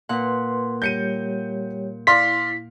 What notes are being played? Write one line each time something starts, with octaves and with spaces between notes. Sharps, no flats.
A#2 B4 F#5 C6
G3 G4 C#5 G6 C#7 D#7
E4 D5 F5 C6 B6